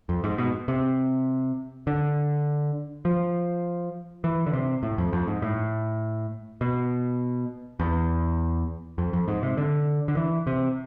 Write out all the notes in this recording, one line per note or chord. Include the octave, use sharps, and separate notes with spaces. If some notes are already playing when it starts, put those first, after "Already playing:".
F2
G#2
B2
C3
D3
F3
E3
D3
C3
A2
F2
F2
G#2
A2
B2
E2
F2
F2
G#2
C3
D3
D3
E3
C3